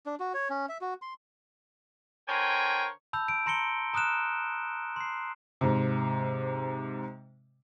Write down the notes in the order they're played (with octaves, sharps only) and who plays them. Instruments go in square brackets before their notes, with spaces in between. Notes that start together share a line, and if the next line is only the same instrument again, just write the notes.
[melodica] D4
F#4
C#5
C#4
E5
F#4
C6
[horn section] D3 A#4 C5 C#5 G5 G#5
[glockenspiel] A5 B5 E6 G6
D7
A#5 C6 A#6 C#7 D7 G7
A#5 D#6 F6 F#6 E7
C6 C7
[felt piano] G#2 C3